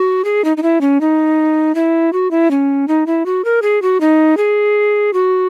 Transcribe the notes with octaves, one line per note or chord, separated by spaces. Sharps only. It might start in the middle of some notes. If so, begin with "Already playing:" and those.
Already playing: F#4
G#4
D#4
D#4
E4
C#4
D#4
E4
F#4
E4
C#4
D#4
E4
F#4
A#4
G#4
F#4
D#4
G#4
F#4